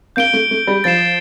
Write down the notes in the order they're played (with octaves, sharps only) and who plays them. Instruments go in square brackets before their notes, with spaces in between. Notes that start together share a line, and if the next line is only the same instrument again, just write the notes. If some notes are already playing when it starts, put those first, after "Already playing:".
[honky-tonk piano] A#3 [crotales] G6 D7 G7
[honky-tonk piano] A3
A3
G3
[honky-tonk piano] F3 [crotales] A6 C7 E7